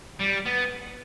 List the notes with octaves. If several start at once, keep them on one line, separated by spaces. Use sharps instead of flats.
G3
B3